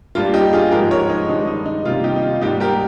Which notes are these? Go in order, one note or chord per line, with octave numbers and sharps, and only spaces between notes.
G2 G3 A#3 F4
D#4 G4
F4 G#4
G#2 F3 G#3 G4 A#4
A#4 C#5
D#4
G2 D#3 G#3 D#4
D#4
D#4
C3 D#3 G3 A#3 F4
D#4 G4
D#4
F4
G#2 G3 A#3 D#4 G4
G4 A#4